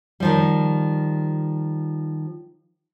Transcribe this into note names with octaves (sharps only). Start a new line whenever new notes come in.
D#3 F3 G3